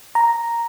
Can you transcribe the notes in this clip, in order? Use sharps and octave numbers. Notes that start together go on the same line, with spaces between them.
A#5